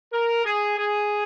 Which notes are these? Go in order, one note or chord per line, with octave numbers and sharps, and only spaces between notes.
A#4
G#4
G#4